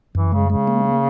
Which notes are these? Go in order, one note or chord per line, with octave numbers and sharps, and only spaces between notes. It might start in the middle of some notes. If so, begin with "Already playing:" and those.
F#2 E3
C#3 G#3
C#3 G#3
A#3
A#3